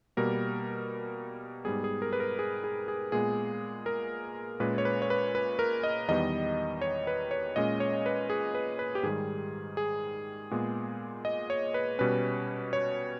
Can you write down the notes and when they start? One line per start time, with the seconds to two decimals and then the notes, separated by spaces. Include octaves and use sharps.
0.17 B2 G3 A#3 A#4
1.65 G#2 G3 B3 G#4
1.84 G#4
2.02 A#4
2.13 B4
2.20 A#4
2.39 G#4
2.64 G#4
2.88 G#4
3.12 A#2 G#3 B3 G#4
3.86 A#4
4.60 A#2 G#3 C#4 B4
4.78 C#5
4.85 B4
5.02 C#5
5.10 B4
5.35 B4
5.59 A#4
5.83 D#5
6.08 E2 D#3 G3 B3 D#5
6.81 C#5
7.07 B4
7.31 C#5
7.56 A#2 G#3 C#4 D#5
7.80 C#5
8.06 B4
8.30 G#4
8.55 B4
8.79 B4
8.95 G4
9.03 G#2 D#3 G3 G#4
9.77 G#4
10.51 A#2 G#3 B3
11.25 D#5
11.50 C#5
11.74 B4
11.99 B2 G3 C#4 B4
12.73 C#5